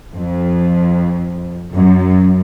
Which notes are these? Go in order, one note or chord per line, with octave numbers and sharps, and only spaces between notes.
F2
F#2